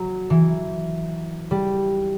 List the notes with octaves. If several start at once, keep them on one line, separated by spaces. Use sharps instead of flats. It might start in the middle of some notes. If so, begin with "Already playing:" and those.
Already playing: F#3
E3
G3